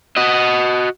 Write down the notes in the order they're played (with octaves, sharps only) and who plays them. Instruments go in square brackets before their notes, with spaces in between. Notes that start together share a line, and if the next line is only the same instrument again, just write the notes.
[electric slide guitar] F#4 D#5